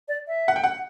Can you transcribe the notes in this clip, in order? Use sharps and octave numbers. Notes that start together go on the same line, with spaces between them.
D5
E5
F#5
G5
F#5